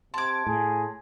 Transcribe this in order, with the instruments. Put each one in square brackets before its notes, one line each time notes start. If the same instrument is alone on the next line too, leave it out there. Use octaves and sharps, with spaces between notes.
[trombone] C3 [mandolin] A5 D6 [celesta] C6 G#6
[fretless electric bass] A2 [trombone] G#4